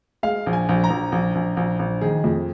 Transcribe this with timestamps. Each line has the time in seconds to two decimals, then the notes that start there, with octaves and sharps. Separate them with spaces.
0.23 G#3 F5
0.46 A#1
0.53 G#5
0.69 A#1
0.84 A#5
0.90 A#1
1.12 A#1
1.35 A#1
1.57 A#1
1.79 A#1
2.01 D#3 G#4
2.24 F2